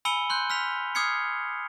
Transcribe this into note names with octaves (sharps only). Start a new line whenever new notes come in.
G#5 B5 E6 C#7 D#7 G7
C6 F#6 G6
F6 B6 F7
D6 D#6 F6 G#6 C7 C#7